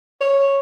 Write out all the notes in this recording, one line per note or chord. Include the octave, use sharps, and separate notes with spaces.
C#5